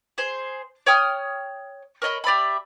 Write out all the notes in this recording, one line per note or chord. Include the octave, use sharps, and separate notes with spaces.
G#4 C5
C#5 G5 D#6 F6
A#4 C#5 D#5 B5
G4 D5 E5 B5